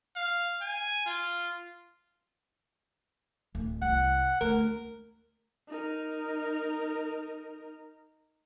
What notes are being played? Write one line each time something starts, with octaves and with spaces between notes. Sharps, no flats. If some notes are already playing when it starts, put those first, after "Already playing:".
F5
G#5
F4
D1
C2 F#5
D2 A#4
D#4 A#4